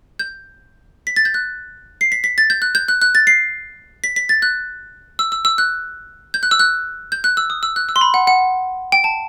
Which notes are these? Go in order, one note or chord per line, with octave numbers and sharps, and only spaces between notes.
G6
B6
A6
G6
F#6
C7
B6
B6
A6
G6
F#6
G6
F#6
F#6
A6
C7
B6
B6
A6
F#6
E6
E6
E6
F#6
G6
F#6
E6
F#6
G6
F#6
E6
D#6
E6
F#6
E6
C6
B5
F#5
F#5
G5
A5